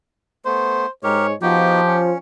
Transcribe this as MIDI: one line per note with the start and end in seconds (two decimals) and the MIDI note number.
0.45 0.86 57
0.45 0.86 59
0.45 0.87 72
1.03 1.33 44
1.03 1.33 56
1.03 1.27 67
1.03 1.27 70
1.03 1.33 73
1.42 2.12 53
1.42 1.81 59
1.42 1.81 63
1.42 1.81 66
1.42 2.00 67
1.87 2.18 61